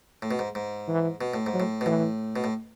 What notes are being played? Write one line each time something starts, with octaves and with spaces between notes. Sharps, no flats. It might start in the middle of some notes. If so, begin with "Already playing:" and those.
A2
B2
G#2
G#2
E3
B2
A2
G#2
F#3
A2
B2
A2 E3
B2
A2